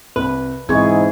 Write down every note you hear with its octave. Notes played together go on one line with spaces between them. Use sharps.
C2 B4
G#2 E3 B3 C4 G#4 D#5 C#6 G#6